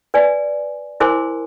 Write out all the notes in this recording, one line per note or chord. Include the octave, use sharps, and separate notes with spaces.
B4 D5 G#5
E4 A#4 C5 G#5 C6 D6